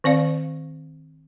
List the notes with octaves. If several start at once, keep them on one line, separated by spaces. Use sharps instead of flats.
D#3 C4 D5 F5